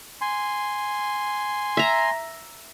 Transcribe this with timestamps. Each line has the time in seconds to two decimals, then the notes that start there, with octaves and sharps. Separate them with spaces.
0.21 G#5 C6
1.77 E5 A#5